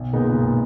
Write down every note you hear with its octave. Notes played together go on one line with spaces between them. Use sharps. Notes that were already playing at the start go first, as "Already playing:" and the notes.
Already playing: B1
A#2 G#3 B3 D#4
B1